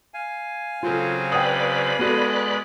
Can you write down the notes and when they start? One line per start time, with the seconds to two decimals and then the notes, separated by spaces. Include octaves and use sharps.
0.14 F5 G#5
0.83 C#3 F#3 C4 F4 A4
1.32 B4 D5 G5 B5 D#6
1.99 G#3 B3 F#4 A4 D#5